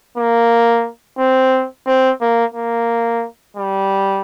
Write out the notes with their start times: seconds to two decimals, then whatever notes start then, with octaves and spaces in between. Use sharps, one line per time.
0.17 A#3
1.18 C4
1.87 C4
2.21 A#3
2.54 A#3
3.57 G3